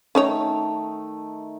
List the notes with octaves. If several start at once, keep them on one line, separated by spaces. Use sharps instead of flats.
D#3 A3 C#4 D#4 C#5